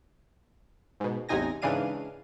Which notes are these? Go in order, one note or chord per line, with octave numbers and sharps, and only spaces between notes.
G#2 B2
A1 E2 C3 D#4 G#5 A#6
G#2 C#3 E3 D4 F5 D#7